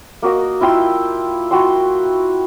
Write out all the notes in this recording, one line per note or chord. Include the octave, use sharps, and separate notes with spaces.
A#3 F#4 D#5
E4 F4 G5 E6
E4 F#4 G5 C6